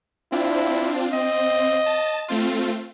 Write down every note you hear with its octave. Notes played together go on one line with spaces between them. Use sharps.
C4 D4 E4 F4
C4 D#5
A5
A3 C4 F4